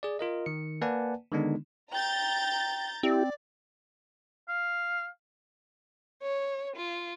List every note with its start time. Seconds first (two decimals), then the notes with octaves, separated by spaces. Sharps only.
0.03 G#4 D5
0.19 F4 A#4 D#5
0.46 D#3 C#7
0.82 A#3 B4 D5 F#5 G#5 A5
1.32 D3 D#3 G#3 B3 D4 D#4
1.92 G5 A#5 G6 A6
3.03 C4 E4 G4 D5
4.48 F5
6.22 C#5
6.76 F4